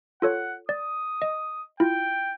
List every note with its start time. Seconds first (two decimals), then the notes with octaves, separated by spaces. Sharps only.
0.22 F4 A4 C#5 F#5
0.69 D5 D#6
1.22 D#5
1.80 E4 F4 G5